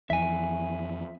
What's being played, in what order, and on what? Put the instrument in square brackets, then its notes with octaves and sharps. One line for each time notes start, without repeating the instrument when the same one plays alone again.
[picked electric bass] F2 E3 [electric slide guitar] E5 G#5